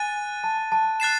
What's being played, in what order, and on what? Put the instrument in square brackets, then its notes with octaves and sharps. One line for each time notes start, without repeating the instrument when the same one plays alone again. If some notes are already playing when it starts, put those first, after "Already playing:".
Already playing: [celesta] G#5 [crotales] F#6 A6 D#7
[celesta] A5
A5
[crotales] F#6 A6 C7 E7